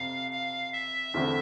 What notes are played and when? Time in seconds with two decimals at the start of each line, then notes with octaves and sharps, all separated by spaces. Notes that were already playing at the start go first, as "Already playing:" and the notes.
Already playing: F2 C3 F5
0.32 F5
0.73 E5
1.14 E2 D3 A3 C4 E4